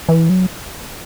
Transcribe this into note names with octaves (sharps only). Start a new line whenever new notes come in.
E3
F#3